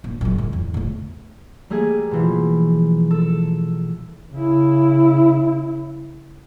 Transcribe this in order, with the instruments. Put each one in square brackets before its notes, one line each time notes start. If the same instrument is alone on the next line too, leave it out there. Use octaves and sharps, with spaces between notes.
[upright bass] A#1
F#2 C#3
A2
E2
C#3 A3
[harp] G3 A3 A#3 G#4
B2 E3 F3
A4
[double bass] C#3 E4